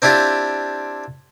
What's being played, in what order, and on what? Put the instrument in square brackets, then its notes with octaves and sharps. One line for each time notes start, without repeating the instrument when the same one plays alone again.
[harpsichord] C4 D4 E4 F4 G4